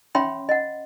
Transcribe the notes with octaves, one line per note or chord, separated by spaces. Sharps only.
C#4 C#5 E5 G5 B5 C6
D#5 F#5